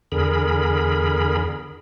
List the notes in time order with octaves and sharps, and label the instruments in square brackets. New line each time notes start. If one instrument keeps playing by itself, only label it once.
[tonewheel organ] E2 D3 G#4 A#4 B5